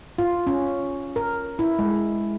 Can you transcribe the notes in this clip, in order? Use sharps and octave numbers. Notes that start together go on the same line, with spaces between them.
F4
C#4
A#4
E4
G#3